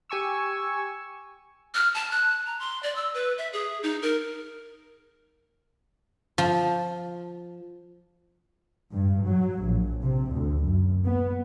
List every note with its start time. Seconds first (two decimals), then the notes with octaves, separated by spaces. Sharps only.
0.09 G4 G#5 C#6 E6
1.74 F6
1.94 A5
2.11 F#6
2.46 A#5
2.59 C6
2.83 D5
2.96 E6
3.14 B4
3.38 E5
3.53 G#4
3.83 D#4
4.02 A#4
6.38 F3
8.92 G2
9.27 F#3
9.62 A#1
10.03 C3
10.33 D2
10.65 F#2
11.06 B3